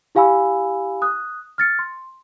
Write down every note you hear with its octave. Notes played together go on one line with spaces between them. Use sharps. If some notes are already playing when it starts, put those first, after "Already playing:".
E4 G4 F5 G#5 B5 E6
D#6 F#6
F6 A6 C#7
C6